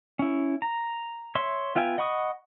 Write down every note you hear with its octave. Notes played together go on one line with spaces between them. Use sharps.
C#4 E4
A#5
C#5 E5 C6
B3 F4 E5 G5 G#5
D#5 F#5 B5 C#6 D#6